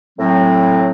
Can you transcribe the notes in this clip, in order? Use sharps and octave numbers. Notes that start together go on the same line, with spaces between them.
A2 F#3 C4